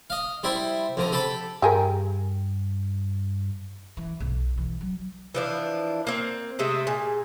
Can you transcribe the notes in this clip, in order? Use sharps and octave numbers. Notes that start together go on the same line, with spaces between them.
D#5 F5
G3 E4 G4 C5 E5
F2 D3 A#5
G4 A4 A5 B5
G2 G4 G#4 A#4
E3
B1
E3
F#3
E3 F3 D4
A#3 C4
C3 G#3 A3 E6
A#2 G#4